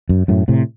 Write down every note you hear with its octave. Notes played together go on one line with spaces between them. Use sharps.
F#2
F#2 A2
A2 C3